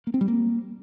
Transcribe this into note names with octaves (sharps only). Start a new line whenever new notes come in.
A#3
C4
G3
A#3